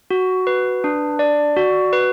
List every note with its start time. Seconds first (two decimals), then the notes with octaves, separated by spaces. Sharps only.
0.11 F#4
0.47 B4
0.84 D4
1.19 D5
1.56 F#4
1.93 B4